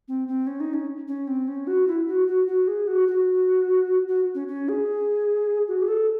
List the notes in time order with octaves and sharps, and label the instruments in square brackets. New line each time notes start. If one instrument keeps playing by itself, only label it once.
[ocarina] C4
C4
C#4
D#4
C#4
C#4
C4
C#4
F#4
E4
F#4
F#4
F#4
G#4
F#4
F#4
F#4
C#4
C#4
G#4
F#4
G#4
A4